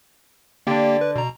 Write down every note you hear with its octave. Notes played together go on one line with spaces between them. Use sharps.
D3 A#3 D4 G4 G5
B4
B2 A#5